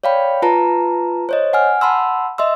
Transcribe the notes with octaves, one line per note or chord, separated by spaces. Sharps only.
C#5 D5 F5 G5 B5
F4 B4 A5 A#5
C5 C#5 D#5
F#5 G#5 F6
F#5 A5 B5 C6 E6
D#5 E5 C6 E6